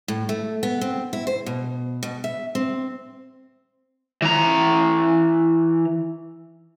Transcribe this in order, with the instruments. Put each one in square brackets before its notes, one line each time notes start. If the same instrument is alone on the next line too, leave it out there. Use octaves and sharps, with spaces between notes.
[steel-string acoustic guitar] A2
A3
B3
C4
E4
C5
B2
B2
E5
C4
[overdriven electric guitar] E3 A#5